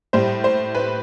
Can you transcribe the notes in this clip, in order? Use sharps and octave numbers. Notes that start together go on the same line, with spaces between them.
A2 G3 C5
C5
B4